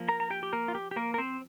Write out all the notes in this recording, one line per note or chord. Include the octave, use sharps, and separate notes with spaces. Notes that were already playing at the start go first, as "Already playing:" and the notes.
Already playing: F3 A#3
A#4 A#5
A#5
G4 G5
G4
A#3 A#4
F4
G4
G4
A#3 A#4
A#4
C4 C5